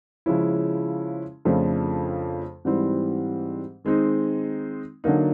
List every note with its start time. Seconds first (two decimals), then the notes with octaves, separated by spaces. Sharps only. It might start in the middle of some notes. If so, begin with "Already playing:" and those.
0.26 C#3 F3 G#3 C#4 E4
1.45 F2 C#3 F3 A3 D4
2.65 G#2 E3 G3 C4
3.84 D#3 G#3 C4 D#4
5.04 D3 F#3 A#3 D#4